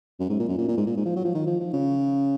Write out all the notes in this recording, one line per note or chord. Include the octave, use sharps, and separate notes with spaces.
F#2
G#2
A#2
F#2
A#2
A#2
G#2
A#2
G#2
F3
F#3
F3
D#3
F3
F3
C#3